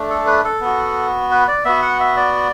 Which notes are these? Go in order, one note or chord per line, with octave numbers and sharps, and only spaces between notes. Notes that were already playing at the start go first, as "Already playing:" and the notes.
Already playing: A3 D4
A4
B4
A4
B3 F#4
B4
D5
B3 F#4 E5
F#5
E5
D5